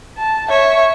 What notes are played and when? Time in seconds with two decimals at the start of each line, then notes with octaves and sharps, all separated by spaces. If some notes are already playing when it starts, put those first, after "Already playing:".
0.18 A5
0.50 C#5 E5